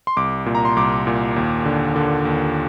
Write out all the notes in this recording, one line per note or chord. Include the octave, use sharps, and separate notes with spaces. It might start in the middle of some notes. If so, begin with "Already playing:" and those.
C6
C2 D6
A#2
A#5
C6
C2 D6
A#2
D#2
D3
D3
D#2